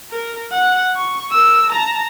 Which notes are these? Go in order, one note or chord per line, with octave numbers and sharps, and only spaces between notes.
A#4
F#5
C#6
A#4 E6
A5 A#5